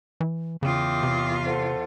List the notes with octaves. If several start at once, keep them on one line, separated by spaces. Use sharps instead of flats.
E3
E2 C#3 F4 G5 D6 D#6
C3
A4 C5 F#5